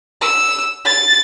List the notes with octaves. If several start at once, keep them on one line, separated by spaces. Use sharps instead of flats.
E6
A6